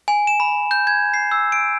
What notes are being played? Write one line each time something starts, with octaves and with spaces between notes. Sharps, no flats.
G#5
E7
B5
G6
G#6
C7
E6
D7